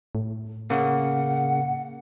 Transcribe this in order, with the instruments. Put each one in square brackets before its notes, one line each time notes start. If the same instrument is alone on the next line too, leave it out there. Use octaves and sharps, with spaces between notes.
[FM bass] A2
[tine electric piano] C#3 A#3 [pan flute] F#5